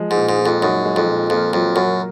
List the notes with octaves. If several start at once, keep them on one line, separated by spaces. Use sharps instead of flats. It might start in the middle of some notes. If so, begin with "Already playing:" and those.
Already playing: F3 G#3
G#2
A#2
G#2
A#2
F2
F#2 D#4
G#3
F2
A#2
F2 A#3
F2 F#3
F#2 A#4